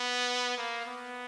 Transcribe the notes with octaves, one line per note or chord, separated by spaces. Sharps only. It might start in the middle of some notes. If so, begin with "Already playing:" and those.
Already playing: B3
A#3
B3